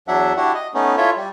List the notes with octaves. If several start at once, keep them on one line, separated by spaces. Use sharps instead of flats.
E2 F#3 D4 E5 F#5
D4 E4 F#4 G4 F#5
D#5
A3 B3 C#4 D#4
E4 F4 A4 C#5 E5
G3